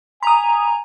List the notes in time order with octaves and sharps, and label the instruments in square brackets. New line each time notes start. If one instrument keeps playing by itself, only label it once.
[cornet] G#5 [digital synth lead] A#5 [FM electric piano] B5 D#6